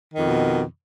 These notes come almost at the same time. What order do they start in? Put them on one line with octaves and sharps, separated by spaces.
D#3 F2 B2